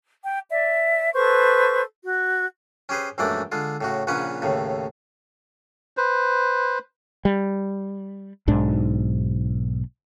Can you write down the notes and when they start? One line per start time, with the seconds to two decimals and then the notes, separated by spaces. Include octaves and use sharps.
0.25 G5
0.50 D5 E5
1.13 A4 B4 C5 C#6
2.02 F#4
2.89 C#4 G4 G#4 B4 C5
3.18 A#1 F#2 E3 G#3 A3 D5
3.52 D3 G#3 F4
3.81 A2 C#3 F#4
4.07 A#1 A#2 C#3 C#4 B4 F#5
4.42 D#2 A2 C#3
5.97 B4 C5
7.25 G3
8.47 B1 G#2 D4